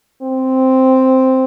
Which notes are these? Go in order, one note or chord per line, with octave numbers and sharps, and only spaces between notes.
C4